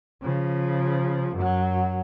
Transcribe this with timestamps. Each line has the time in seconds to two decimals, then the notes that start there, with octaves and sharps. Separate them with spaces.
0.22 C#3 F3
1.34 F#2 F#3